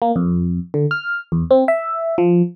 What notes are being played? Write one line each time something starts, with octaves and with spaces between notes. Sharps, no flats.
A#3
F2
D3
F6
E2
C4
E5
F3